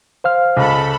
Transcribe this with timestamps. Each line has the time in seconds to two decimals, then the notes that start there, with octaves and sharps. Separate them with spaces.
0.24 C5 F5 F6
0.57 C#2 A4 B5